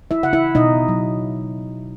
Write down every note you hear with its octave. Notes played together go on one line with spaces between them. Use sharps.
E4 E5
C#3 F#5
E4 E5
B2 D#4 D#5
F#3